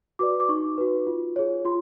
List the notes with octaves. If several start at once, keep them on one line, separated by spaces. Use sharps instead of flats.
F#4 B4 D5 D6
D6
D#4 C#6
F#4 B4
F4
G#4 C#5
F4 C6